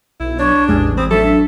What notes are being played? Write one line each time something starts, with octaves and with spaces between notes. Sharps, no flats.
B1 E4
D4 C#5
A1 E2 G3 G#3 G#4
C4 B5 D#6
F#3 D4 A4 E5